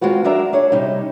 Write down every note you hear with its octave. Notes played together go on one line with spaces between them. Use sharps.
D#3 G#3 C4 F4 F#4 B4
F#3 G#3 D4 A#4 E5 A#5
D4 G#4 C#5
C3 G3 C#4 D#4